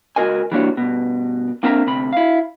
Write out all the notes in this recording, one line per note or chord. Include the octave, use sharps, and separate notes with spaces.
C#2 F#2 F#4 A#4 D#5 G#5
E3 G3 A#3 D4 F#4 C#5
G2 B2
A#3 C4 D4 A#4 E5 A#5
D2 C3 B5
E4 F5